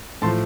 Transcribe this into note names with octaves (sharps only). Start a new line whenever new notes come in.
A2 F3 A5 C6